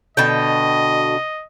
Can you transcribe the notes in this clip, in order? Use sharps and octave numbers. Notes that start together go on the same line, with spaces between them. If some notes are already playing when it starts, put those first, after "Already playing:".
B2 D3 D#5 G5